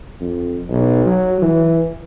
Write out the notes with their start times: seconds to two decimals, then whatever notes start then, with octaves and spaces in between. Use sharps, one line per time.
0.21 F2
0.69 B1
1.06 F#3
1.41 E3